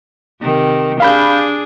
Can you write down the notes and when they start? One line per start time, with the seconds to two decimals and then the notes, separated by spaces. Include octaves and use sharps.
0.41 C3 D#3
1.00 D4 G#4 F5 B5 G6